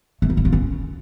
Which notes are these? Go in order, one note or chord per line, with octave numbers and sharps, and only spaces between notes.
A3
D#4
E4
F4
C#4